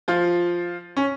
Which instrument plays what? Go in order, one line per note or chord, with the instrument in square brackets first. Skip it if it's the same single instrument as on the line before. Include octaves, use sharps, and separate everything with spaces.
[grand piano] F3 F4
C#4